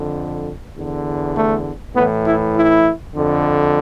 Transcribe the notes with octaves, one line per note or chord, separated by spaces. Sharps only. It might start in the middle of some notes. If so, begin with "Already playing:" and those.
Already playing: F2 D3
E2 D3
A3
A2 E3 B3
E4
E4
F2 D3